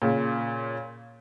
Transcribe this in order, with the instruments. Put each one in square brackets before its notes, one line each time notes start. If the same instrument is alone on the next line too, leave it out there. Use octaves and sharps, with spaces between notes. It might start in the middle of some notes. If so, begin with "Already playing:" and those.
[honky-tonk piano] A#2 C#3